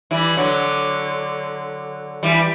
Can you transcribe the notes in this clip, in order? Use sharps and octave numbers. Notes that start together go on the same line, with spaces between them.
E3 G3
D3 F#3
E3 G3